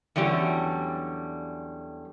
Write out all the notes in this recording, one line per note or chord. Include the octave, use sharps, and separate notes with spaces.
E2 D3 F#3 G3 C#4